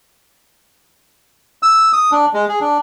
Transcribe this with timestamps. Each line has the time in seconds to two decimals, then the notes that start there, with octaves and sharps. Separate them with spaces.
1.63 E6
1.93 D#6
2.12 D4
2.34 G#3
2.49 G#4
2.61 D4